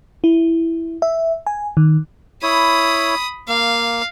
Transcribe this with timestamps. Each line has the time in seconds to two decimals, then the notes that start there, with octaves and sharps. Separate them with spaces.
0.24 E4
1.02 E5
1.47 G#5
1.77 D#3
2.43 E4 C#5 B5 D#6
3.48 A#3 F5